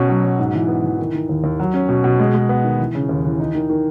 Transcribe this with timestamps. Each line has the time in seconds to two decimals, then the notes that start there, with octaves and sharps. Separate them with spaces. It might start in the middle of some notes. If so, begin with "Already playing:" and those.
Already playing: B2 C#4
0.09 F#3
0.24 F#3
0.39 G#2
0.54 E3
0.68 B3
0.84 E3
0.99 D#3
1.14 D#3
1.29 D#2
1.44 D#2
1.60 F#3
1.74 C#4
1.89 B2
2.04 B2
2.19 G#3
2.34 G#3
2.49 B3
2.64 D#3
2.79 E3
2.95 C#3
3.09 D#2
3.24 E3
3.40 D#4
3.55 D#3
3.70 D#3